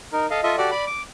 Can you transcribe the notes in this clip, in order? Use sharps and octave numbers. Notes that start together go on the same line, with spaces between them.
D#4 A#4
A4 D#5 F5
F4 A4 D#5 E5
F#4 G4 A4 D5
D5 B5
D6